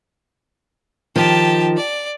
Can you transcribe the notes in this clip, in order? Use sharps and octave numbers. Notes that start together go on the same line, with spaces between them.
D#3 F3 G4 A5
D5